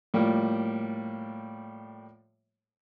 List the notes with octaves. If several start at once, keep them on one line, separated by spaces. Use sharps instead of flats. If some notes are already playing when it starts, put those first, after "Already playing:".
A2 F3 G3 A#3